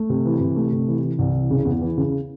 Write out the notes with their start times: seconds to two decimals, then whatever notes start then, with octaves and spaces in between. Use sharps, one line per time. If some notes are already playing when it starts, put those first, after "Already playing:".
Already playing: A3
0.10 C3
0.25 E3
0.41 C3
0.56 A3
0.72 C3
0.88 E3
1.03 E3
1.19 C2
1.34 E3
1.50 C#3
1.65 E2
1.81 E3
1.97 C#3